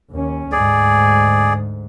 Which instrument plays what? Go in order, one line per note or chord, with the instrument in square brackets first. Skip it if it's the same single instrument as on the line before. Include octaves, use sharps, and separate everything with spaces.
[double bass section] D#2 C#4
[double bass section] D2 G#2 [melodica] G#4 D5